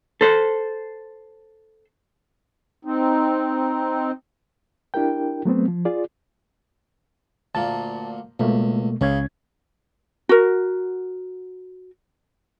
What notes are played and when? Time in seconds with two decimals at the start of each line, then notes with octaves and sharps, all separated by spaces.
0.21 A4 C5
2.85 C4 D#4
4.94 D4 E4 G4 A#4 G5
5.45 F#3 A3 B3 C4
5.68 F3
5.85 F4 G#4 D5
7.55 D2 A#2 A5
8.40 C#2 B2 A3 A#3
9.01 C#2 C#3 C#4 G#6
10.29 F#4 A#4